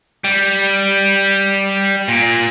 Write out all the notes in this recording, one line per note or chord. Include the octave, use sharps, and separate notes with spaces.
G3
A#2